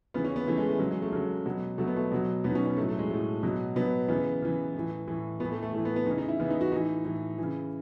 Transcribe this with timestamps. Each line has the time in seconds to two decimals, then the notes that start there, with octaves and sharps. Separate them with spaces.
0.14 C#3 E3 B3
0.24 C#4
0.36 B3
0.46 C#3 E3 A3
0.57 G#3
0.68 A3
0.79 C#3 F#3 G#3
0.91 G#3
1.02 A3
1.12 C#3 F#3 A3
1.46 B2 F#3
1.78 B2 F#3 A3
1.87 B3
1.96 A3
2.12 B2 F#3
2.44 B2 F#3 B3
2.50 D#4
2.55 C#4
2.66 C#4
2.77 A2 F#3 A3
2.89 A3
2.99 G#3
3.10 A2 F#3 A3
3.43 B2 F#3
3.76 B2 F#3 B3
4.08 C#3 E3 B3
4.42 C#3 E3
4.74 A2 E3
5.08 A2 E3
5.40 A2 B3
5.45 E3
5.52 A3
5.63 A3
5.73 A2 E3 A3
5.85 B3
5.96 B3
6.06 E3 D#4
6.11 C#3
6.18 D#4
6.29 E4
6.39 C#3 E3 B3
6.50 D#4
6.61 F#4
6.72 A2 E3 D#4
7.05 A2 E3
7.38 C#3 E3